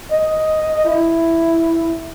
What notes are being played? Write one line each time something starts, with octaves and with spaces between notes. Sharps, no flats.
D#5
E4